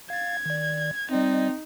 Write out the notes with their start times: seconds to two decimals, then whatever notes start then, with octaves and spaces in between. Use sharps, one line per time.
0.10 F5 G#6 A6
0.46 D#3 D5
1.11 G3 C4 D#4 D5 D#5